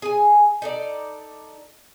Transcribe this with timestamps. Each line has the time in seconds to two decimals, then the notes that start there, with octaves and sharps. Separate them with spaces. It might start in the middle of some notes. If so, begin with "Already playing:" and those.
0.02 G#4 G#5
0.62 D#4 A4 D5